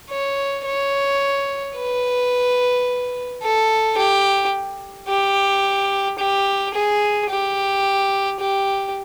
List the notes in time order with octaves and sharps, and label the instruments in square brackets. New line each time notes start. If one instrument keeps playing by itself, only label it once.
[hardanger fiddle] C#5
C#5
B4
A4
G4
G4
G4
G#4
G4
G4